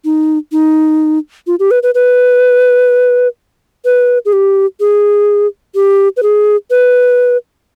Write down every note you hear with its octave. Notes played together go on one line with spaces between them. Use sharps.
D#4
D#4
F4
G4
B4
B4
B4
B4
G#4
G4
G#4
G4
B4
G#4
B4